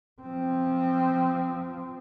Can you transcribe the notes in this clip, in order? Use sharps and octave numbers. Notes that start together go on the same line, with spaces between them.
F3 C4